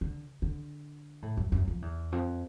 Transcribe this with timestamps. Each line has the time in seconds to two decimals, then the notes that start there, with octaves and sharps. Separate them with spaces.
0.01 D3
0.42 D3
1.22 A2
1.37 F#2
1.52 F#2
1.68 F2
1.82 E2
2.12 F2